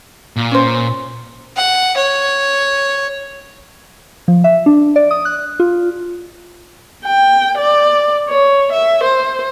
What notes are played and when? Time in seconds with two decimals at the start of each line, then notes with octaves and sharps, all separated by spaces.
0.36 A#2
0.51 C#4 C5
1.57 F#5
1.97 C#5
4.28 F3
4.44 E5
4.66 D4
4.96 D5
5.11 D#6
5.25 F#6
5.60 F4
7.05 G5
7.57 D5
8.29 C#5
8.72 E5
9.03 C5